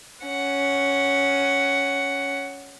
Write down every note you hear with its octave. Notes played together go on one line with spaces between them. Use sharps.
C#4 F#5